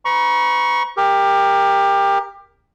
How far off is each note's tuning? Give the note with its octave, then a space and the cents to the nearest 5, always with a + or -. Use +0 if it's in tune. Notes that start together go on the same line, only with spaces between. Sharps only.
B4 +40 A#5 +45 C#6 +0
G4 +20 A#4 +0